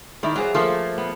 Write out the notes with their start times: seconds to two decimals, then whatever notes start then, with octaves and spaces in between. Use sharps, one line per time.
0.23 D#3 E4 A#4 D5
0.36 F#3 F4 G#4 C5
0.55 F3 A3 A#3
0.98 B3